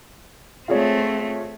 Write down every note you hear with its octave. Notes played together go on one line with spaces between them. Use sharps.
A3 C4 F4 G#4 C#5